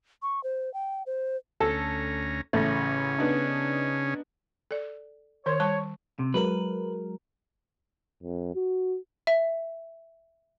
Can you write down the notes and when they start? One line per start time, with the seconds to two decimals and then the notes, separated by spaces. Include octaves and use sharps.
0.22 C#6
0.44 C5
0.74 G5
1.06 C5
1.60 D2 C#4 A4 A#5
2.53 A1 C#3 A3 C#4 A#6
3.19 B3 D4 D#4
4.71 A4 D5
5.46 D#3 A#4 C#5 C6
5.60 G3 A5 C#6
6.19 C3
6.34 F#3 G#3 A#4 B4
8.23 F2
8.55 F#4
9.27 E5